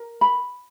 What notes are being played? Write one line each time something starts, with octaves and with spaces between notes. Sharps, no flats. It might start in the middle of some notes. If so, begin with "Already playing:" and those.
Already playing: A#4
B5